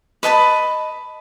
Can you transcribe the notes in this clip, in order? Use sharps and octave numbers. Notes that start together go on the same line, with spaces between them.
B4 D#5 A5 B5